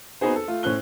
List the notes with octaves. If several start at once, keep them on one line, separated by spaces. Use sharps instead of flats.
B3 C4 D#4 F#4 G#4 C5
A4
A3 F4
A2 C#4 C5 F#6 G7